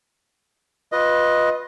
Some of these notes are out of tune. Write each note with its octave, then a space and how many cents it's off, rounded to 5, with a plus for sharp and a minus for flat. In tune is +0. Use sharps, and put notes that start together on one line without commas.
F4 +25 B4 +0 D#5 +5